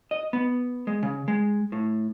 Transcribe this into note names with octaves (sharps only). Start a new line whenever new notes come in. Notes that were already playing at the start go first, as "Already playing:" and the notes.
D#5
B3
G#3
C#3
G#3
A2